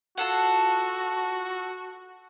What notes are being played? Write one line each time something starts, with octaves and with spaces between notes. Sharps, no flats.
F4 F#4 A4 F#5